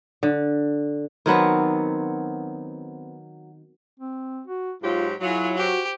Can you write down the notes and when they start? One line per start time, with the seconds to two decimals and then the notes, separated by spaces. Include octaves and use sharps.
0.23 D3
1.26 D#3 F#3 B3 C4
4.00 C4
4.47 F#4
4.83 G#2 F#3 F4 G4
5.21 F#3 E4 F4 G#4
5.57 F#4 G4 C5